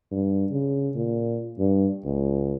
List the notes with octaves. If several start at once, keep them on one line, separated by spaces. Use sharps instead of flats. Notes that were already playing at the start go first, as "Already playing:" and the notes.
G2
C#3
A#2
G2
C#2